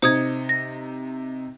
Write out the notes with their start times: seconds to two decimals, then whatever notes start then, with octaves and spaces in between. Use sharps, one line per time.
0.02 C3 D#4 C5 D#6 G#6 C#7
0.49 A#6